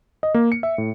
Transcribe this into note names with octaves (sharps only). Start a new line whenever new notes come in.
D#5
A#3
C#7
E5
A2